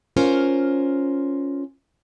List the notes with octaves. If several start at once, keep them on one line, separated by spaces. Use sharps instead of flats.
C#4 F4 A#4 C5